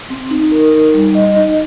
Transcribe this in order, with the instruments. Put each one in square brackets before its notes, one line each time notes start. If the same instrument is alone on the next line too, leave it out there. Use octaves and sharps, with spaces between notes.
[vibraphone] C4
D#4
A#4
D#4
G3
D#5
D#4